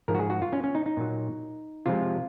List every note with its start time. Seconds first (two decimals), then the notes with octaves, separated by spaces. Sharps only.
0.08 G#2 F3 G#3 A#4
0.15 F#4
0.19 G#4
0.30 F#4
0.42 F4
0.53 C#4
0.64 C#4
0.75 D#4
0.86 D#4
0.97 A#2 F#3
1.86 C3 F3 G#3 F4